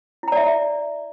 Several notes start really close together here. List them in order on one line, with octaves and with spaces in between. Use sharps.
E4 A#5 D5 E5